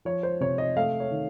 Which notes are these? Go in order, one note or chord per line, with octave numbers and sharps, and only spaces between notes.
F3 C#5
C5
C3 C#5
D#5
A3 F5
C#5
D#3